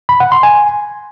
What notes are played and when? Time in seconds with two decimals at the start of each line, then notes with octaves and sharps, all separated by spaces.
0.09 B5
0.20 F#5
0.32 C6
0.43 G#5